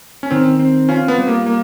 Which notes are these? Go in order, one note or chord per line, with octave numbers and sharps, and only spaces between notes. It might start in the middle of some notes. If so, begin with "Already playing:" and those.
C#4
D#3 C4
C4
C#4 F4
B3
G3
A#3
A#3